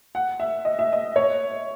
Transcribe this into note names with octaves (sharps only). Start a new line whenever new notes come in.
F#5
E5
D#5
E5
D#5
C#5